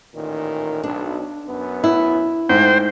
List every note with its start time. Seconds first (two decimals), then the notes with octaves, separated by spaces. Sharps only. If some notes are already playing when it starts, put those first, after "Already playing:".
0.15 A1 A#2 D#3
0.83 B1 D4
1.47 F#2 B3
1.84 E4
2.49 G#2 A3 C5 G5